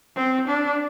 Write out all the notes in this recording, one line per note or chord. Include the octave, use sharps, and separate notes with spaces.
C4
D4